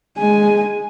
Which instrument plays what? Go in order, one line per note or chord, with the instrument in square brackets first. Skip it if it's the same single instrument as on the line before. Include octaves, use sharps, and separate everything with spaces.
[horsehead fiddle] G#3 G#5